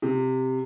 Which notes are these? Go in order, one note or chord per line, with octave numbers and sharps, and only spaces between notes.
C3